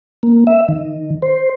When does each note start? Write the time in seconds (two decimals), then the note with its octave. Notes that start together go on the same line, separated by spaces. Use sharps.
0.23 A#3
0.47 E5
0.68 D#3
1.22 C5